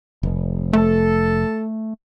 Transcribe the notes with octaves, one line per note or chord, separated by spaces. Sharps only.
F1
A3 A4